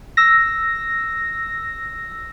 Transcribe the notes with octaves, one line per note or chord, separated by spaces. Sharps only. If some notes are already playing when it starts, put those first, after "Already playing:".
E6 A#6